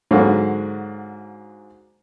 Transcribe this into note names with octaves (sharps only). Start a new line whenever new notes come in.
G#2 D3 F#3 A#3